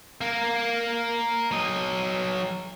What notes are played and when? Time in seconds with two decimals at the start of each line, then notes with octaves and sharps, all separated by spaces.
0.21 A#3 A#4
1.51 F#3 D#5